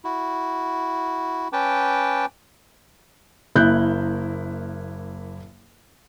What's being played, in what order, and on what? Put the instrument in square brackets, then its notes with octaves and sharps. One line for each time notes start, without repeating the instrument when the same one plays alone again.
[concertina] E4 F#4
C#4 B4 G5 A5 D6
[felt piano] F#1 A#3 E4 F#6 G6